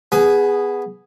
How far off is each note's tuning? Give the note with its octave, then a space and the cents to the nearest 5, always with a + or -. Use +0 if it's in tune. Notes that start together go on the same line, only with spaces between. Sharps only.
B3 +0 G#4 -10 G#5 +30